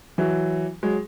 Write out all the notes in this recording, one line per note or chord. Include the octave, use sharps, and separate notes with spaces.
E3 F#3
F#3 G#3